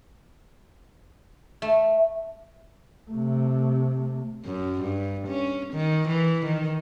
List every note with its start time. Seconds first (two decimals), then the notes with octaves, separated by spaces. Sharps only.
1.62 A3
3.11 C3 A3
4.45 F#2
4.82 G2
5.28 C#4
5.74 D#3
6.08 E3
6.46 D#3